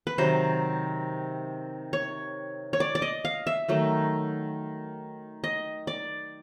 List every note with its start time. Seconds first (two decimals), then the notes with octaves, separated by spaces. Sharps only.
0.07 B4
0.18 C3 D#3 F#3 C5
1.93 C#5
2.73 C#5
2.80 D5
2.95 D5
3.02 D#5
3.25 F5
3.47 E5
3.69 D#3 F#3 A3
5.44 D#5
5.87 D5